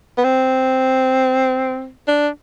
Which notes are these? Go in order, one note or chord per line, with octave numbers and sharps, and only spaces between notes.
B3
C4
D4